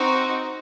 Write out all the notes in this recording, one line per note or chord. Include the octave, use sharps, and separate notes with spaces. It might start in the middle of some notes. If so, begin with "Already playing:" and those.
Already playing: C4 D#4 F#4